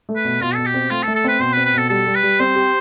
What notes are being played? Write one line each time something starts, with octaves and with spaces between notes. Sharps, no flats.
A3
B4
B2
B2 F4
B2 A4
G4
C4
A3 F4
A4
A3
A4
C4 B4
B2 C5
B4
C4
B4
B2 A4
G3 A4
G3
B4
G3
C4 C5
G4